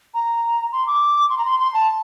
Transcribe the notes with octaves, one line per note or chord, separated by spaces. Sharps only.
A#5
C6
D6
C6
A#5
C6
C6
A5